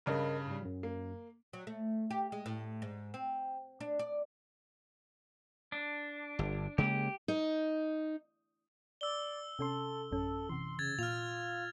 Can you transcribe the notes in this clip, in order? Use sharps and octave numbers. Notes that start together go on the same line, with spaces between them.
G2 C#3 A#4 D#5 B5
G#2 G3
F#2 F#3
A#3
F#3
A3
G4
G#3
A2
G#2
C4
D4
D5
D4
G1
C#3 G#3 A#3 G4
D#4
D5 E6 G7
C3 C#4 A4 C6
A1 F#2 C#4 A4
C3 E3 C6
C#3 G#6 A6
A#2 F4 F6 F7